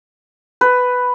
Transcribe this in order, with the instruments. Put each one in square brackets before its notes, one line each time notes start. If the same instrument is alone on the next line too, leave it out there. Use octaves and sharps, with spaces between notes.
[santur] B4